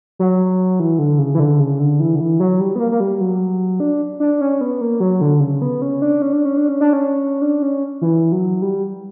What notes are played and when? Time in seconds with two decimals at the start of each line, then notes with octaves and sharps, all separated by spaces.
0.19 F#3
0.80 E3
0.99 D3
1.19 C#3
1.35 E3
1.40 D3
1.60 C#3
1.80 D3
2.00 E3
2.15 D3
2.20 E3
2.40 F#3
2.60 G3
2.76 B3
2.79 A#3
2.92 A#3
3.00 G3
3.20 F#3
3.80 D4
4.20 D4
4.41 C#4
4.61 B3
4.81 A#3
5.00 F#3
5.21 D3
5.40 C#3
5.62 B3
5.82 C#4
6.02 D4
6.22 C#4
6.33 D4
6.45 C#4
6.57 D4
6.69 C#4
6.81 D4
6.93 C#4
7.42 D4
7.62 C#4
8.01 E3
8.32 F#3
8.62 G3